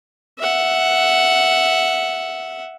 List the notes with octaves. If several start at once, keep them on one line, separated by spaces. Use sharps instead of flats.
E5 F#5